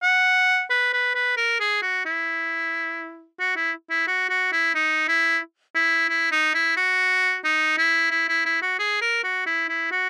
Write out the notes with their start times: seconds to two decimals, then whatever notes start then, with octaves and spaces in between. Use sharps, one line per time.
0.03 F#5
0.70 B4
0.93 B4
1.15 B4
1.37 A#4
1.60 G#4
1.82 F#4
2.06 E4
3.40 F#4
3.56 E4
3.90 E4
4.07 F#4
4.30 F#4
4.52 E4
4.75 D#4
5.08 E4
5.75 E4
6.09 E4
6.32 D#4
6.54 E4
6.77 F#4
7.44 D#4
7.78 E4
8.11 E4
8.29 E4
8.46 E4
8.62 F#4
8.79 G#4
9.02 A#4
9.24 F#4
9.46 E4
9.69 E4
9.91 F#4